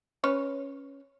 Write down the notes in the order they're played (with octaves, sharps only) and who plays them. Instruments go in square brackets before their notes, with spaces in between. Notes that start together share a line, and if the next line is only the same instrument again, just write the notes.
[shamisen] C#4 B4 C#5